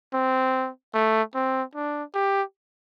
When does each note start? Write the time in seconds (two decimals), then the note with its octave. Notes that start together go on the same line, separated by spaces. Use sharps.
0.14 C4
0.94 A3
1.35 C4
1.75 D4
2.14 G4